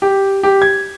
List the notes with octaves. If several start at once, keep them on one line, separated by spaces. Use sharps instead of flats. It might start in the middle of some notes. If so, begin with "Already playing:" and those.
G4
G4
G#6